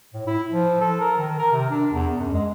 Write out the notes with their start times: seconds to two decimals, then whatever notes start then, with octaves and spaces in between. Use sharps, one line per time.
0.14 A2
0.27 E4
0.52 F3
0.81 A4
1.00 A#4
1.18 D#3
1.39 A#4
1.52 C3
1.70 D4
1.92 E2
2.18 F#2
2.33 G#3